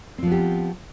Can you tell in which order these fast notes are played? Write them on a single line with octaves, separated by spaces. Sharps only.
C4 F3 B3 G4